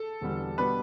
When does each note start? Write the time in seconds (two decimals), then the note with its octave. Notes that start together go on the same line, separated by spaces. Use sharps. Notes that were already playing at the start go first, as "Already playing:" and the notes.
Already playing: A4
0.21 E1 E2 D3 G3
0.58 B2 G3 B3 D4 B4